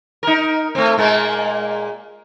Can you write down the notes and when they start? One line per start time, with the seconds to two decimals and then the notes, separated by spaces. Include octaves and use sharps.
0.23 D#4 A#4
0.75 A3 C4
0.98 A#2 G#3 A#3